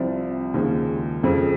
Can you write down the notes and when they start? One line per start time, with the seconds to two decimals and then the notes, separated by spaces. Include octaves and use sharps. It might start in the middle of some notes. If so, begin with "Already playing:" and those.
Already playing: C2 C3 F3
0.54 D#2 C#3 F3 G#3
1.23 F2 C#3 F3